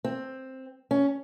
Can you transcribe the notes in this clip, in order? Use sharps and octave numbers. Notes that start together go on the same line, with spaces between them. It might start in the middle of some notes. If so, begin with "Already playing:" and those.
C4
C#4